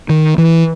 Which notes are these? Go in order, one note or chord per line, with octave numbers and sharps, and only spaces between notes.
D#3
E3